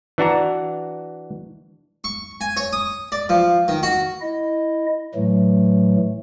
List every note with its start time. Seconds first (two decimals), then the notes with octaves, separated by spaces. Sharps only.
0.18 E3 D4 F#4 A#5
2.04 C#6
2.41 G#5
2.57 C#5
2.73 D#6
3.12 D5
3.29 F3
3.68 D#3
3.83 F#4
4.21 E4 D#5
5.15 A2 E3 F#3 A3